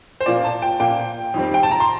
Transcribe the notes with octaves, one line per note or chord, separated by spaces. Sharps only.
C5
A#2 F3 A#3 D5
A5
G5
A#2 F3 A#3 G5
F2 D#3 G3 C4
G5
A5
A#5
C6